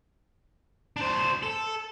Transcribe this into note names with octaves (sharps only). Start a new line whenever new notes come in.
D4 C5
A4